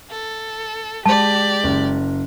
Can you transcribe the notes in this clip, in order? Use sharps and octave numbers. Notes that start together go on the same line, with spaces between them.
A4
G#3 G4 D5 A5
F#1